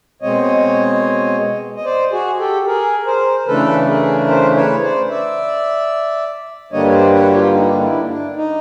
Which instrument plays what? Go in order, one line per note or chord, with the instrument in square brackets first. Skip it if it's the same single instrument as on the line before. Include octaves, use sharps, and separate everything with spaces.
[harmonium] B2 G#3 C4 C#5 D#5
D#5
C5 D5
F#4 G#4
G4 A4
G#4 A#4
A#4 C5
C#3 E3 A3 D4 A4 B4
G#4 A#4
A#4 C5
B4 C#5
C5 D5
D5 E5
G2 D3 G3 A#3 D4 C#5 D#5
C#5
C5 D5
B4 C#5
F#4
F4 G4
D#4
D4 E4
D4
D#4